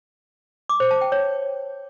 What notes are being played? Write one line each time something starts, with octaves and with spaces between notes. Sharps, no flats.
D6
C5
A5
G5
C#5